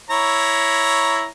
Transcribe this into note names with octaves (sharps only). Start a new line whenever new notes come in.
E4 C#5 A#5